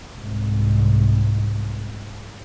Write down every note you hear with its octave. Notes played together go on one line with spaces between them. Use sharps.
C2 G#2